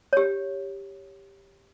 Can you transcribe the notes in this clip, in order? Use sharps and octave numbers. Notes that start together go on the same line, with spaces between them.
G4 C#5